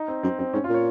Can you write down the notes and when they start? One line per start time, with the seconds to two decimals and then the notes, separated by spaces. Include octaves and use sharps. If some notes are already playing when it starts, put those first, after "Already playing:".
Already playing: D#4
0.08 C4
0.23 F#2 C4
0.39 F#2 C4
0.54 G#2 C#4
0.64 F4
0.69 A#2 C#5